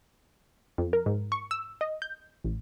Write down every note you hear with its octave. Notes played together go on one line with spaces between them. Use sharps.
F2
A#4
G#2
C#6
E6
D#5
G6
A1